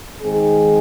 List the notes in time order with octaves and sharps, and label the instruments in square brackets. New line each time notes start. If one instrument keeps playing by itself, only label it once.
[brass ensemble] D#3 G#3 C4 D#4 G#4